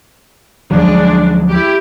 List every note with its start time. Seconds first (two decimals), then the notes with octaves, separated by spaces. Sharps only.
0.71 D2 F3 F#3 G#3 D4
1.50 E4 G4